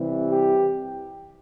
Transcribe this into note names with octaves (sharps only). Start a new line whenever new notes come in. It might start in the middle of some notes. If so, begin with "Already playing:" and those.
Already playing: C3 E3 G3
G4